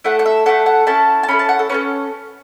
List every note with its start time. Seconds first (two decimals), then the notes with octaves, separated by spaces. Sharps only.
0.04 A3 E4 A4 F#5
0.19 F#5
0.26 E5
0.46 A3 E4 A4 F#5
0.66 F#5
0.87 C#4 E4 A4 A5
1.23 A5
1.28 C#4 E4 A4 B5
1.39 A5
1.49 F#5
1.59 A4
1.69 C#4 F#4 A4 B4